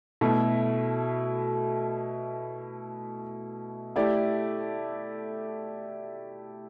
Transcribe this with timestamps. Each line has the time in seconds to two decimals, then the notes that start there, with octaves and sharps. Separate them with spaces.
0.21 B2 A3 E4
3.96 A3 E4 G4 D5